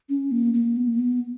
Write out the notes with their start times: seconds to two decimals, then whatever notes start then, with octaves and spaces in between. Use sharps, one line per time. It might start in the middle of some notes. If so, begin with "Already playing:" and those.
0.09 C#4
0.31 A#3
0.54 A#3
0.76 B3
0.88 A#3
0.99 B3